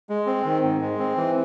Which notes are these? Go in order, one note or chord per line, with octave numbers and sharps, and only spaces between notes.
G#3
C4
D#3
G#2
G#3
C4
E3